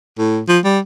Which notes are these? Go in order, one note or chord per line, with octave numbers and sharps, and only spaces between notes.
A2
F3
G3